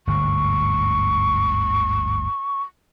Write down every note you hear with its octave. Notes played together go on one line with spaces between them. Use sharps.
G1 D2 G#2 C#6